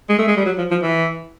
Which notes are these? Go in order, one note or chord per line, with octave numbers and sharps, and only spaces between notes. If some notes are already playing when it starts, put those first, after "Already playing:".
G#3
A3
G#3
G3
F#3
F3
F3
E3